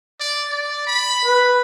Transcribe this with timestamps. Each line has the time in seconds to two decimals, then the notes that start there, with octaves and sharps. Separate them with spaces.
0.20 D5
0.50 D5
0.87 B5
1.25 B4